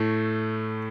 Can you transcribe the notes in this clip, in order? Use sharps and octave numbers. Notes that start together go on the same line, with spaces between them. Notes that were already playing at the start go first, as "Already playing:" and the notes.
Already playing: A2 A3